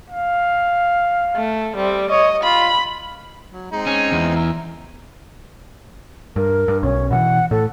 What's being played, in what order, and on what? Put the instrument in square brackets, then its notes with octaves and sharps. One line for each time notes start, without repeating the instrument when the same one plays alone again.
[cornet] F5
[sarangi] A3
[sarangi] G3 [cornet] C4
[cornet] C#5 [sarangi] D#5
[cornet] F4 [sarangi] B5
[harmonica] F#3
G#3 C4 D#4
[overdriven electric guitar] C#4
E2
[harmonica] E5 A#5
[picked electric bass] G2 [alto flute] A#4
[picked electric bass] G2
[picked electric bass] B1 [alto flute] C#4
[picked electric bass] B2 D#3 E3 [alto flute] F#5
[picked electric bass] A2 [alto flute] A4